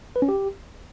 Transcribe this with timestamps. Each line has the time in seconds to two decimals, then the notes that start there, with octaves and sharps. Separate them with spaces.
0.16 B4
0.22 C#4
0.29 G4